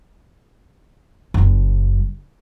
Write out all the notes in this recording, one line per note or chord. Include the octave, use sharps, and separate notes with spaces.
F#1 F#2